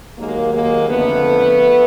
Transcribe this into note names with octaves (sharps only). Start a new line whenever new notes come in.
D#2 D#3 F#3 G#3 A#3
G#3 A#3
F2 D3 F3 A3 B3